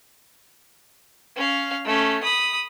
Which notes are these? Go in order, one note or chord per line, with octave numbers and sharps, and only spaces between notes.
C#4 F5
A3 C#4
B5 D#6